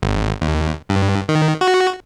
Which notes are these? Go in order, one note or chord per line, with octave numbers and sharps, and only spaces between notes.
G#1
D#2
G2
D#3
F#4